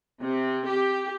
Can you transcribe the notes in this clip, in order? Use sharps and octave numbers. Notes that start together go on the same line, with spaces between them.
C3
G4